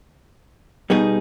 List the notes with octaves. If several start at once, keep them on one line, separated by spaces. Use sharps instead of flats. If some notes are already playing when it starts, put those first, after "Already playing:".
B2 G3 B3 D#4 G#4